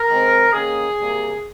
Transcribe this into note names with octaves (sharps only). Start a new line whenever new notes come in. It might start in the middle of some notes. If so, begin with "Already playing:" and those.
Already playing: A#4
D#3 G#3 C4
D#3 A#3 C#4 G#4
C3 G3 A#3